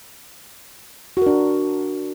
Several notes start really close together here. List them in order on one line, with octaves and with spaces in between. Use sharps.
F#4 A#4 D4